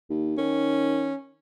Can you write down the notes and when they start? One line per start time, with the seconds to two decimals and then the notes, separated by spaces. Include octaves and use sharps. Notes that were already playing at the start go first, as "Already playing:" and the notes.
0.10 D#2
0.38 D#3 C#4